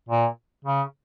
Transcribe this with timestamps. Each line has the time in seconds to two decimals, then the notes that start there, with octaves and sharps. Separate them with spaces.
0.09 A#2
0.65 C#3